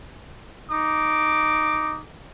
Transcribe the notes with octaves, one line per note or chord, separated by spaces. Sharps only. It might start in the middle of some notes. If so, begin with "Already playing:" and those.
D#4 D6